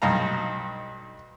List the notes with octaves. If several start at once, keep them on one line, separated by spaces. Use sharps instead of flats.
B1 G2 D#4 F5 A#5